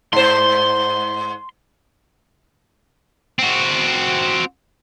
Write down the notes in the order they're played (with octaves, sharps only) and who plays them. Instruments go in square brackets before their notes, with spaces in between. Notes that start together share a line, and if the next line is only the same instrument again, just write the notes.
[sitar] G#2 C5 [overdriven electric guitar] C6
[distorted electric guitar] C4 F#4